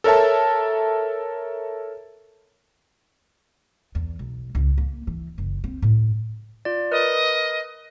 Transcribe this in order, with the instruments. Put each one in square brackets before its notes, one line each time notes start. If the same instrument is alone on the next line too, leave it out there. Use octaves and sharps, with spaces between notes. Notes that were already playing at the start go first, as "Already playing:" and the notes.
[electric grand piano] A4 A#4 C#5 E5 A5
[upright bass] E2
B1
C#2
A#3
E3
F#1
C4
A2
[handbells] F4 D5
[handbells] A#4 B4 [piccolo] D#5